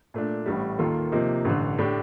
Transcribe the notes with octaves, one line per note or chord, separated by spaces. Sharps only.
A#2 A3 D4
A1 A2 G3
D#2 D#3 A#3 F4 A4
C3 F3 A#3 D#4
A1 G2 D3
A2 A3 D4 G4